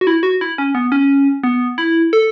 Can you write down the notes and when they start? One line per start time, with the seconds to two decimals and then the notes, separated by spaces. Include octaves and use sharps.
0.01 F#4
0.07 E4
0.23 F#4
0.41 E4
0.58 C#4
0.75 B3
0.92 C#4
1.44 B3
1.78 E4
2.13 A4